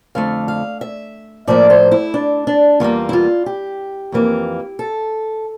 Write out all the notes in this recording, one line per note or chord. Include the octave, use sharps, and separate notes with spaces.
F2 D3 A3 F5
F5
E5
A2 F3 A#3 D5
C5
E4
D4
D4
E2 D3 G3 A#3 F4
E4
F4
G4
F2 E3 A#3
A4